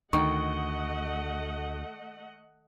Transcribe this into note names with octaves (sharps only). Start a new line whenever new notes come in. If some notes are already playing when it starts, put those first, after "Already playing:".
D2 D#3 A3 D#5 F#5 C#6